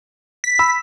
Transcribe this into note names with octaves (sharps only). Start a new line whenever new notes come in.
B6
B5 E6